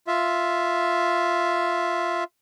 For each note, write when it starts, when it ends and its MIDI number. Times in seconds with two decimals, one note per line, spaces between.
0.07 2.24 65
0.07 2.24 76